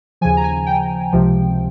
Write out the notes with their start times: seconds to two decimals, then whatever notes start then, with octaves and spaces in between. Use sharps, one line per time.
0.21 D#2 C#3 F3 G#5
0.37 A#5
0.44 G#5
0.66 G5
1.13 C#2 C3 F3